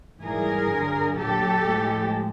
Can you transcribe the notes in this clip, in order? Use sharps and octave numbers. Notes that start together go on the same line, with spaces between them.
G#2 E3 G3 G#4 A#4
G2 D3 F#3
A#2 F#3 G4 A4
A2 F3 G#3